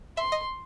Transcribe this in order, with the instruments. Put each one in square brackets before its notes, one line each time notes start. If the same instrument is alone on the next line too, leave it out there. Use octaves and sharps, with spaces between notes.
[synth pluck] E5 [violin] C6
[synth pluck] D#5